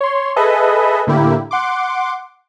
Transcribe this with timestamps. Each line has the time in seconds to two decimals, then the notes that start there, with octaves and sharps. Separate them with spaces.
0.01 C#5 C6
0.36 G#4 A4 B4 D#5 E5
1.07 A2 D3 A#3 E4 G4
1.51 F#5 C6 D6